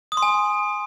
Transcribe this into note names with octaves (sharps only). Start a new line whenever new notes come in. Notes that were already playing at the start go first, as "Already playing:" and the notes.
D#6
C6
G#5